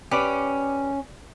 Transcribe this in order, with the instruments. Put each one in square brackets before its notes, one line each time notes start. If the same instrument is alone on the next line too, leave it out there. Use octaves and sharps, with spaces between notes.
[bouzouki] C#4 [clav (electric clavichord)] G4 B4 D5